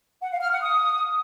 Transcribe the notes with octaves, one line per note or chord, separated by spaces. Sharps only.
F#5
F5
F6
F#5
D#6